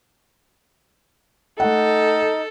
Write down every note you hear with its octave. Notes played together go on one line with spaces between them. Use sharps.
A3 D#4 A4 F#5